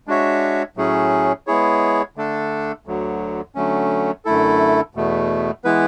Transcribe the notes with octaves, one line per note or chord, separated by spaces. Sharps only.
G#3 D4 F#4 C#5 E5
A2 F#3 A3 C#4 G#4
G#3 B3 E4 G#4 C#5
D3 A3 D4 A4
D2 D3 F#3
D3 F#3 A3 C#4
F#2 D3 A3 E4 A4
E2 B2 A3
E3 G#3 B3 E4 B4